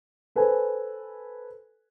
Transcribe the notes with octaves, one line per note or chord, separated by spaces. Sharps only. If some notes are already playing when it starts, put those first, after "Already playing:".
A4 B4 C5 G#5